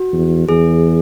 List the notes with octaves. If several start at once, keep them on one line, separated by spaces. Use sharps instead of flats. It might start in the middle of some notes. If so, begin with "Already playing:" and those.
Already playing: F#4
E2
E2 G#4